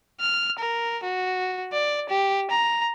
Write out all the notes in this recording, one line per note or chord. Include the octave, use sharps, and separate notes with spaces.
F6
A#4
F#4
D5
G4
A#5